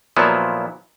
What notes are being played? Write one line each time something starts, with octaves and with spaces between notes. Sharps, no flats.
A#2 F3 F#3 B3 E4